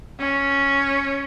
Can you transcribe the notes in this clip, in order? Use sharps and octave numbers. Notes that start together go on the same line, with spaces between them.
C#4